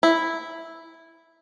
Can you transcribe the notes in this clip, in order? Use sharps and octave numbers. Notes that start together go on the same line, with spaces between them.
E4